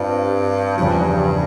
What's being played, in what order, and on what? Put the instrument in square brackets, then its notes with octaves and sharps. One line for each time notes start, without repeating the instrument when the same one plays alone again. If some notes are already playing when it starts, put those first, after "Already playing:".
Already playing: [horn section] G2 [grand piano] C4 F4
[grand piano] E2 C#3 F3 [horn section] G2